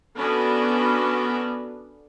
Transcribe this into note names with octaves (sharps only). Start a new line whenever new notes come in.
B3 C#4 D4 F#4 A4 B4